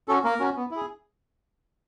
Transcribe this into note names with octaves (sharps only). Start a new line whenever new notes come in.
C#4 F#4 A4
A#3 A#4
C#4 F#4
B3
E4 G#4